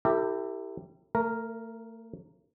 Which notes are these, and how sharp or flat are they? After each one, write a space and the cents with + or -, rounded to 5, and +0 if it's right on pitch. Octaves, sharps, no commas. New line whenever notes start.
E4 +0 G4 +0 A#4 -45
A3 +35 A#4 +0